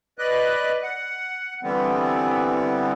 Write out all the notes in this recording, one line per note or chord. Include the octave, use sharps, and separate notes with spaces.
B4 D5 D#5 F#6
F#5
D3 E3 G3 B3 C4